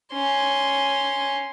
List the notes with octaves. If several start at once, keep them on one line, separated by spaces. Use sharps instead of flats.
C#4 C6